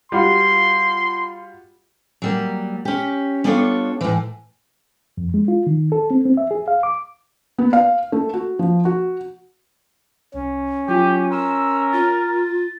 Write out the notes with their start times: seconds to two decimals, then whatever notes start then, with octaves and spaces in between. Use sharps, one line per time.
0.12 G3 F4 F#4 C6
2.22 F#3 G3 A#3
2.85 C#4 G4
3.44 G3 B3 D4 F4 A4 C#5
4.01 A2 E3
5.17 F2
5.34 G#3
5.48 F4
5.67 D#3
5.92 A4
6.10 C4
6.25 C4
6.37 E5
6.51 G#4
6.68 F5
6.83 D6
7.58 B3
7.73 F5
8.12 A3
8.34 F#4
8.59 F3
8.85 F#4
10.34 C2 C#4
10.88 F#3 F4 G4 G#5
11.31 A#4 C6 E6 E7
11.93 F4 A6